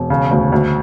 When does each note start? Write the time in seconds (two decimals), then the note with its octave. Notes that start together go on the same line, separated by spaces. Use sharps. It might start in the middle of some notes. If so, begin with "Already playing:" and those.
Already playing: E1
0.10 C#3
0.31 D2
0.52 D2